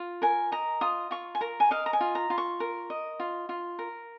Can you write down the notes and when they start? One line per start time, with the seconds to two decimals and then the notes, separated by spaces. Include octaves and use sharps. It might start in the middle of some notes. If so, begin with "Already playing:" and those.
Already playing: F4
0.22 A#4 G#5
0.52 D#5 A#5
0.81 F4 D#6
1.11 F4 C#6
1.35 G#5
1.41 A#4 A#5
1.60 G#5
1.71 D#5 F5
1.86 A#5
1.93 G#5
2.01 F4
2.15 A#5
2.30 F4
2.38 C#6
2.60 A#4
2.90 D#5
3.20 F4
3.49 F4
3.79 A#4